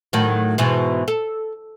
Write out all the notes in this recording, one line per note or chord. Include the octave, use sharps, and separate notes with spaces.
A2 D#3 F#3
G#2 B2 E3
A4